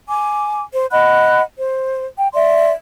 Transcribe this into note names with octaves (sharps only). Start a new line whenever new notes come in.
G#5 D6
C5
D#5 F#5 B5 F#6
C5
G5
D5 E5 C6